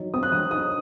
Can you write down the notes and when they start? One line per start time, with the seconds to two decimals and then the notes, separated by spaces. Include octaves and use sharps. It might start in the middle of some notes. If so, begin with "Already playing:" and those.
Already playing: F#3 D#4
0.14 C4 D#6
0.23 F#6
0.32 F#3 D#6
0.50 D#4 D#6